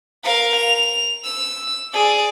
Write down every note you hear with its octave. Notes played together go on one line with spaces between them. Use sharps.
A#4 F5
F7
E6
G#4 D5